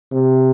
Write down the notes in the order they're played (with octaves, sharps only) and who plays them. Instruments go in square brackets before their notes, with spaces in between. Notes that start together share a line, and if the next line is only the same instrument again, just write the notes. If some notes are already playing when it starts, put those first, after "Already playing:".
[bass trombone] C3